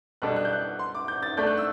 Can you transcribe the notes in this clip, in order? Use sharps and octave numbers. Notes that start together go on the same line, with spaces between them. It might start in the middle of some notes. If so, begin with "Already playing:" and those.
B2 G3 D4 A4 F#6
F#6
G6
F#6
C6
D6
G6
A6
A3 D4 A4 D5 G6
F#6
E6